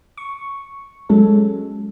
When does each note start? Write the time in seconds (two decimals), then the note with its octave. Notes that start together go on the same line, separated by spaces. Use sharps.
0.18 C#6
1.09 F#3 G#3 C#4 A4